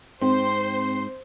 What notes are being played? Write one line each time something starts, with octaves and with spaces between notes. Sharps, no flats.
G#2 C4 C5 C6